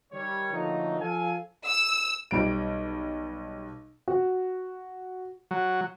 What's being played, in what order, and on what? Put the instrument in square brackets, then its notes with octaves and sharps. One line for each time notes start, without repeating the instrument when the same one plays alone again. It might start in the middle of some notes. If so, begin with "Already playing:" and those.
[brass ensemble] D#3 G3 C#5
D3 F3 F#3 A3 A#3 D#4
F3 A4 F5 G#5
[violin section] E6
[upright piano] B1 G3 D7
F#4
[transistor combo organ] F#3